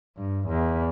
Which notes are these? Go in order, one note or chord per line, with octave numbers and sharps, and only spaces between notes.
G2
E2